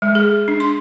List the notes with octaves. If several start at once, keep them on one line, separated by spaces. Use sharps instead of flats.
G#3
G#4
D4
C6